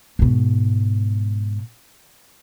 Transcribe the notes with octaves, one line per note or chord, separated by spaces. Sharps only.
G#2 B2